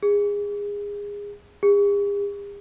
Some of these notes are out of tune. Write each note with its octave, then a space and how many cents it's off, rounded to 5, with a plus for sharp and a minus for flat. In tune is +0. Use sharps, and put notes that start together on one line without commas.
G#4 -25
G#4 -45